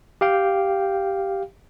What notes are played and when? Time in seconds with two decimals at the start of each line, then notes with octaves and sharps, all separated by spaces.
0.21 G4 F5 G5